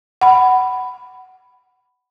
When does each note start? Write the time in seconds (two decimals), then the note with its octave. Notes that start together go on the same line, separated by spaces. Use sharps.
0.21 F#5 B5